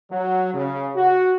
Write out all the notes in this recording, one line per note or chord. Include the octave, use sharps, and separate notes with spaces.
F#3
C#3
F#4